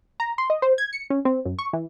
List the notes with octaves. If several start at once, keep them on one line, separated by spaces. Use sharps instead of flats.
A#5
C6
D#5
C5
G#6
C#7
C#4
C4
F#2
C#6
E3